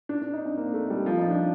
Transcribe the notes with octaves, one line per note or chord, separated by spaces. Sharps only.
D4
D4
D#4
C4
A#3
A3
G3
F3
D#4
D4